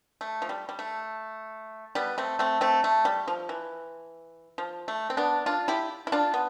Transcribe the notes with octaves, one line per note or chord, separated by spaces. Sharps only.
A3
F3
G3
G3
A3
G3 B3
A3 C4
A3 C4
A3 C4
A3
G3
F3
E3
F3
A3
C4
B3 D4
D4 F4
E4 G4
E4
D4 F4
B3